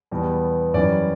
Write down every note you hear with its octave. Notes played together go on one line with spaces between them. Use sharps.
E2 B2 G3
F#2 E3 G3 D5